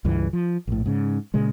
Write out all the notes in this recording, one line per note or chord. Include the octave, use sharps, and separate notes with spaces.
C#2 G2 E3
F3
A#1 A2
G#2 C#3
A#2 C#3 G#3